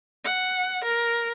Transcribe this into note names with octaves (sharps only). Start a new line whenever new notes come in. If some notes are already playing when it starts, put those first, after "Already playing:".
F#5
A#4